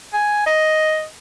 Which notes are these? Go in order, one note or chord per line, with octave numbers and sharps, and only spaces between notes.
G#5
D#5